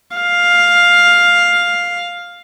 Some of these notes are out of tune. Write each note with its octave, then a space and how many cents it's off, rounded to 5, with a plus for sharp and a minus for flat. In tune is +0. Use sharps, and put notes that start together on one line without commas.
F5 +5